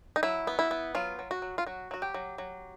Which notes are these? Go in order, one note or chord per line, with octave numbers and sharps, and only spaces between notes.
D#4
F#3 E4
B3
E4
B3
F#3 F4
F#3
F#4
F#3
F4
F#3 F#4
F#3 F#4
G4
F#3
F#3